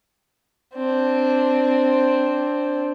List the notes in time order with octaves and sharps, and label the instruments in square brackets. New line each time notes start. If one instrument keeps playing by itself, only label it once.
[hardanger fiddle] C4 D4